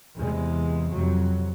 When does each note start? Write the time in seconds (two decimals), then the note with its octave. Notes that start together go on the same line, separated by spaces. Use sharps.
0.16 E2 C3 G#3
0.93 F2 C3 F#3